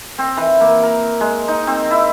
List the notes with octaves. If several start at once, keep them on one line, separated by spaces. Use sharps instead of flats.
C4
E3
A#3
A#4
G#3
D#4
C4
E4